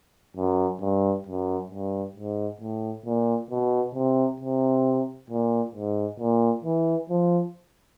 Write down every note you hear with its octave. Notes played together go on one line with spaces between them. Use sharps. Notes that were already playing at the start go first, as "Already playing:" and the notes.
F#2
G2
F#2
G2
G#2
A2
A#2
B2
C3
C3
A#2
G#2
A#2
E3
F3